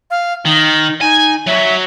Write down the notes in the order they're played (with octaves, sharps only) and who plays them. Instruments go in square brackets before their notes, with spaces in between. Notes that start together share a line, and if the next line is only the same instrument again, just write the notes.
[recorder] F5
[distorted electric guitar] D#3 [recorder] D#4
[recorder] D#4 [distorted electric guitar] G#5
[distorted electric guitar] F#3 [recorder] E5